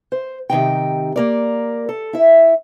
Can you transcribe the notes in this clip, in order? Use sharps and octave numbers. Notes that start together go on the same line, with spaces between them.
C5
C3 D#3 D#4 G5
A#3 A#4 D5
A4
E4 E5